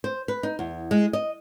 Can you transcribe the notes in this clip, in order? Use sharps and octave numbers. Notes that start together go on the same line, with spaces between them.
C5
B4
D#4
E2
G#3
D#5